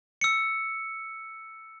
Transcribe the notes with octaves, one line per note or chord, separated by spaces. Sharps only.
E6 C#7